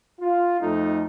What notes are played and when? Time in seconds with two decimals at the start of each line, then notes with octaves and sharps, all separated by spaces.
0.20 F4
0.61 F2 A3 D#4